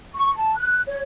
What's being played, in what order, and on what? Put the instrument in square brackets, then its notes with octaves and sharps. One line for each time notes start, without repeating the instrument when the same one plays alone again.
[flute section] C#6
A5
F#6
C#5